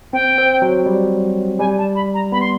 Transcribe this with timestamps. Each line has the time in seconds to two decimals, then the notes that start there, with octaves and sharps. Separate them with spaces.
0.13 C4 G5
0.38 C4
0.62 F#3
0.86 G3
1.59 G3 G#5
1.78 A5
1.95 B5
2.14 A#5
2.32 B3 B5
2.41 C6